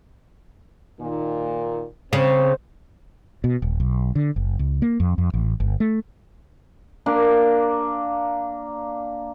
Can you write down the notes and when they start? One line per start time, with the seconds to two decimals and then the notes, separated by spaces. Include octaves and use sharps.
1.00 A#2 D#3
2.13 C#3 C4 C5
3.44 B2
3.62 D#1
3.80 B1
4.15 D3
4.36 F#1
4.59 C#2
4.82 A#3
5.00 F2
5.18 F2
5.34 A1
5.60 G1
5.80 A3
7.06 A#3 D4